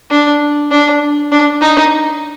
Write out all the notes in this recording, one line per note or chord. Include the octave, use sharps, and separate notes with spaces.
D4
D4
D4
D#4